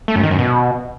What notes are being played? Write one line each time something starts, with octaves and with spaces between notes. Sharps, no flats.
A3
F#2
D#3
F#2
B2